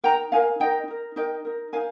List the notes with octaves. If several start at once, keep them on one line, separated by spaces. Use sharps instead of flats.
D#4 A#4 G5 A#5
D#4 A#4 F5 G#5
D#4 A#4 D#5 G5
D#4 A#4
D#4 A#4 D#5 G5
D#4 A#4
D#4 A#4 F5 G#5